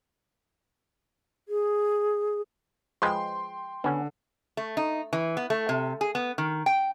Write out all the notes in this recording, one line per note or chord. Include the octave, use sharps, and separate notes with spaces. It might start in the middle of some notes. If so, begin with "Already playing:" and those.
G#4
F3 G#3 B4 G5 C6
D3 B3 C#4
A3
D#4
E3
B3
A3
C3
G#4
B3
D#3
G5